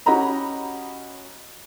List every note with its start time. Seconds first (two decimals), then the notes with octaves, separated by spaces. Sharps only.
0.06 C#4 F#4 G4 D#5 A#5 B5